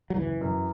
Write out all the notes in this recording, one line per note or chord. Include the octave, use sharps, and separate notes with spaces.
F#3
F#1 E3
F#2